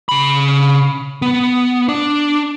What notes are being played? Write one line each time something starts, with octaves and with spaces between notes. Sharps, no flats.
C#3 B5
B3
D4